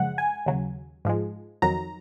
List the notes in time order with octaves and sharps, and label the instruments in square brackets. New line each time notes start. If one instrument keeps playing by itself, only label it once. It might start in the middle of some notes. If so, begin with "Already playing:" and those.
Already playing: [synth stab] F#2 C#3 F3 G#3 F#5
G#5
D#2 C#3 F#3
G#2 F3 G#3
F2 D#3 F#3 A#5